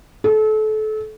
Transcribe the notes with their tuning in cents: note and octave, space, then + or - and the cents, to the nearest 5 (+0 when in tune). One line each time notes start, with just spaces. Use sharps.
A4 -30